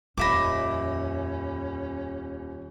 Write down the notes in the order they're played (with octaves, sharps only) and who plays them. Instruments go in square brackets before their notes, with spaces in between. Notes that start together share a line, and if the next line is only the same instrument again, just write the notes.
[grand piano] D#1 B5 [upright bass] F2 [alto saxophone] C#4 [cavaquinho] D#5 E5 D6